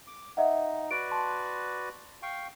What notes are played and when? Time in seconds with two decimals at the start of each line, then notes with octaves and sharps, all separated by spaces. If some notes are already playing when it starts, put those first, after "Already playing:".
0.07 D6
0.37 D#4 D#5 E5 F#5
0.91 F#4 B4 D5 D7
1.11 A5 C6
2.23 F5 G5 C#6